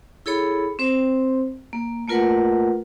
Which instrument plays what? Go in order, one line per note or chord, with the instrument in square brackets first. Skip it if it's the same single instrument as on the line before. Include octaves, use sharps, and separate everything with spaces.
[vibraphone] E4 G#4 A4 C#5 B5
C4 C5
A#3
A3 A#3 F4 A#4 B4 F#5